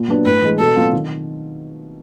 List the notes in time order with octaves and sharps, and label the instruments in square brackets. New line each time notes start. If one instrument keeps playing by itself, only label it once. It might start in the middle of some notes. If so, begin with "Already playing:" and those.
Already playing: [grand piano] A#2
F#3 B3 D4
[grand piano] A2 [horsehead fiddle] B4
[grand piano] E3 G#3
[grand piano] B2 [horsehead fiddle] A4
[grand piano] F#3 A3 C4 F4
D#3